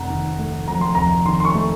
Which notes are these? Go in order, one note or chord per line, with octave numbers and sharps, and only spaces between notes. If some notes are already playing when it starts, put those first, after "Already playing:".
Already playing: F1 F2 F#5 A#5
D#3
A3
F2 A#5
C6
F1 A#5
D#3 C6
C6
C#6
A3